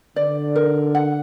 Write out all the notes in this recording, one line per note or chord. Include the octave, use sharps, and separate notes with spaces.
D3 D5
A#4
F#5